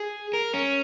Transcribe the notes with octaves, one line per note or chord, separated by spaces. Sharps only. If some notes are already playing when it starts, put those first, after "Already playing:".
Already playing: G#4
A#4
C#4